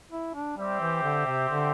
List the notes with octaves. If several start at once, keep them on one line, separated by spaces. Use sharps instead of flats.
E4
D4
G3 C4 G4 C5 E5
E3
D3
C3
D3